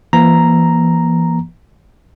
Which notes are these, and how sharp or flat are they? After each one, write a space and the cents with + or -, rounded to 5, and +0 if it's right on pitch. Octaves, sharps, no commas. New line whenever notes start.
E3 +35 A#3 +25 A#5 +0